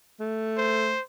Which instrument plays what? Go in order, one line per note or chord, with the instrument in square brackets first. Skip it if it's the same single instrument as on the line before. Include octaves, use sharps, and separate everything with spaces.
[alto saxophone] A3
[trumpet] C5